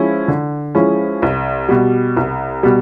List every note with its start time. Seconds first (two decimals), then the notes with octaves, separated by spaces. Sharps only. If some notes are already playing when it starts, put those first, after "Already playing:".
Already playing: F3 G#3 C#4 E4
0.28 D3
0.75 F3 G#3 C#4 E4
1.22 C2
1.68 B2 G3
2.17 C2
2.63 B2 G3